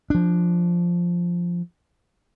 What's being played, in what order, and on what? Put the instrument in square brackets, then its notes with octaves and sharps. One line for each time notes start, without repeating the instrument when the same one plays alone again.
[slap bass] F3 D4